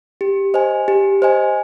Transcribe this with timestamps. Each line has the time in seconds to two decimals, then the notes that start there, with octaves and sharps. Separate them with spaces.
0.21 G4
0.54 C5 D#5 G#5
0.88 G4
1.22 C5 D#5 G#5